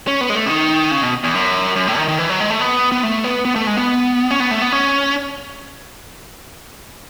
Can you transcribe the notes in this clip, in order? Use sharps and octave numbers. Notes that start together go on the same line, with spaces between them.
C#4
B3
G#3
A3
C#3
D#3
C#3
B2
E2
F#2
F#2
A2
D#3
D#3
E3
F#3
G#3
A3
B3
B3
A3
B3
B3
A3
G#3
B3
C#4
B3
A3
B3
C#4